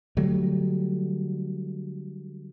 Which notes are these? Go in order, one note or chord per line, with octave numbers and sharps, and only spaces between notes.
D3 F#3 G3 A3